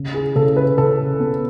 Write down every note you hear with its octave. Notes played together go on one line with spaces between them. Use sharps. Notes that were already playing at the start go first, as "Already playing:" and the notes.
Already playing: C#3
G#4
C#3 A4
B4
C#3 A4
B3